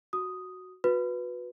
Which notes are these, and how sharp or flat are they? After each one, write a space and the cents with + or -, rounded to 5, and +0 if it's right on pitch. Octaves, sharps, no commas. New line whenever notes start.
F#4 +0 D#6 +0
F#4 -30 B4 +0